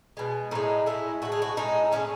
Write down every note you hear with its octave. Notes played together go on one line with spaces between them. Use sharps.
B2 G#3
A2 G#3 D#4
A2 G#3 E4
A2 G#3 F#4
G#4
F#4
A2 G#3 D#4
A2 E3 G#3 C#4